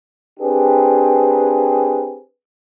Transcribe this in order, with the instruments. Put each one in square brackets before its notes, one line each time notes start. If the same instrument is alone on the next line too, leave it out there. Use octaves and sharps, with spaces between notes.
[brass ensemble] C4 D4 G4 G#4 B4